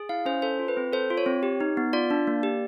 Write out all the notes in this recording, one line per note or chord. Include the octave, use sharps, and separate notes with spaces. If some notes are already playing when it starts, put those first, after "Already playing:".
Already playing: G#4
E4 F5
C#4 C5
A4 C5
F4
B4
C4
A4 C5
F4
C#5
C4
G4
D#4
B3
F4 D5
D4
A#3
G4